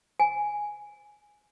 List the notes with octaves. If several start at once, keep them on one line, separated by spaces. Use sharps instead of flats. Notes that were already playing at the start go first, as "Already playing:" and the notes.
G#5